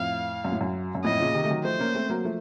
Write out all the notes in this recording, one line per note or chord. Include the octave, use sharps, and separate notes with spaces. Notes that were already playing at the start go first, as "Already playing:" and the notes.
Already playing: F2 A2 F5
F#2
A2
F#2
F#2
F2 A2 D#5
A#2 C#3
C3 D#3
A3
D#3 F#3
F3 A3 C5
A#3 C#4
A3 C4
F#3 A#3
F3 A3